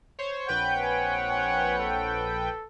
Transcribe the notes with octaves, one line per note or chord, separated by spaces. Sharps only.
C5 C#5
A#1 C4 B4 C#5 F#5 G5 G6
G#5
G#5
A4